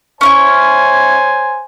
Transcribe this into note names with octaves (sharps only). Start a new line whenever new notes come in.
C#4 D#4 E4 C5 C#5 G#5